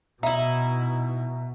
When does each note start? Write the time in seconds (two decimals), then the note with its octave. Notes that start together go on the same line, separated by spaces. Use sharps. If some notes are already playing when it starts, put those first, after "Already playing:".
0.23 B2 D#4 E4 E5 A#5